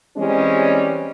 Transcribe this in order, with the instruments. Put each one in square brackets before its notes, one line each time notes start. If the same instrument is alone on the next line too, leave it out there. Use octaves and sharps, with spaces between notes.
[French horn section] E3 G3 G#3 C4 C#4